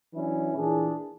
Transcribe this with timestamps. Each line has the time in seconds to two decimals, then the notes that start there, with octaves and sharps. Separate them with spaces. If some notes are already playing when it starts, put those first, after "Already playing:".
0.14 E3 F#3 C#4 D4 E4
0.55 A#2 E3 D4 G#4